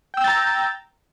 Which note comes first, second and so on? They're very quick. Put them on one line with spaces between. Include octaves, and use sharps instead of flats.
G5 E6 G6 A6 A#5